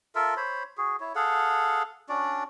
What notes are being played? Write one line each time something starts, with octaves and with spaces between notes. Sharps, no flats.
F4 A4 A#4 E5
C5 C#5 B5
F#4 G#4
E4 C#5
G#4 A4 F5 F#5
C#4 D4 F#4 D5